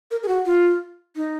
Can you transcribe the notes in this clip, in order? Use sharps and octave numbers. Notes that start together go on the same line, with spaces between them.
A#4
G#4
F#4
F4
D#4